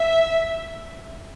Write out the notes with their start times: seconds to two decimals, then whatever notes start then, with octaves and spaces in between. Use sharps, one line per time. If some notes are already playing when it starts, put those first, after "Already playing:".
Already playing: E5